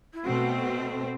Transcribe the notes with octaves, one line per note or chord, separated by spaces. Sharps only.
E4
B2 A3 C4 F#4